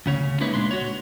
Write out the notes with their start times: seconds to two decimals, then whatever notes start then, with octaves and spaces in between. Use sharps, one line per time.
0.06 D2 C#3 C#5
0.40 G#3 A#3 D#4 E4 B4 C#5
0.54 A#2 G#3 D4 C6
0.71 F#4 C#5